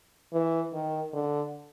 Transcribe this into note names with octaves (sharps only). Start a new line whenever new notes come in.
E3
D#3
D3